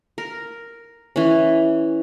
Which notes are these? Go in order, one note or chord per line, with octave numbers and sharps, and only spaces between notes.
A#4
E3 C#4